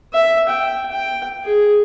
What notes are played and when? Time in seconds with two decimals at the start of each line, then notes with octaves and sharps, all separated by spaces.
0.13 E5
0.49 G5
0.91 G5
1.44 G#4